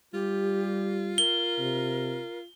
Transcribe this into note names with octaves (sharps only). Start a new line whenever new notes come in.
G3 F4 G4
A#4 G7
C3